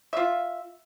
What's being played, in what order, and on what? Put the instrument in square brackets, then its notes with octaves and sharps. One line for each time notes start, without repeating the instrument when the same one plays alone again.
[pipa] F4 E5